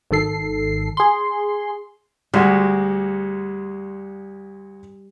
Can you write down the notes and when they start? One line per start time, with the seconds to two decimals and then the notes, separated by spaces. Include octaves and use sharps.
0.11 G#1 D#3 A4 C7
0.97 G#4 C6
2.34 D2 G3 G#3 F#4